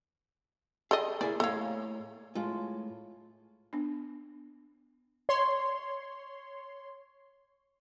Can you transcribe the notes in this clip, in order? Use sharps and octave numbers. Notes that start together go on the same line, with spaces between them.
G#4 A4 D5 D#5
A#3 E4 G#4 D5
A2 A#3 A4 C#5 F5
A2 G#3 F4
B3 D4
C#5 C6